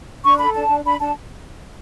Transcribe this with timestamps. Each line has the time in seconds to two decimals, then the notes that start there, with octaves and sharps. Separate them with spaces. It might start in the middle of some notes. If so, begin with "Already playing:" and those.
0.24 D4 C#6
0.39 A4 B5
0.54 D4 A5
0.69 D4
0.85 D4 B5
1.00 D4 A5